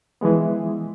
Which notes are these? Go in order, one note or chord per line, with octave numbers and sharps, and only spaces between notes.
E3 F3 G#3 B3